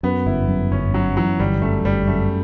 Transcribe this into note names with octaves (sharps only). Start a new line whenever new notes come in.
F#2 B3
G1 E4
F#2
G1 C#4
F#2 F#3
E3 F#3
G1 G3
F#2 A3
G1 G3
F#2 A3